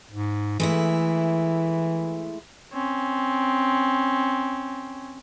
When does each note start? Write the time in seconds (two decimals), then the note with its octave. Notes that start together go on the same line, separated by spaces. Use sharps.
0.12 G#2
0.60 E3 G#3 A3 E4
2.73 C4 C#4